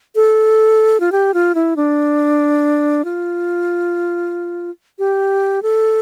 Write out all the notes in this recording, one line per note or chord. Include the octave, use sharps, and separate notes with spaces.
A4
F4
G4
F4
E4
D4
F4
G4
A4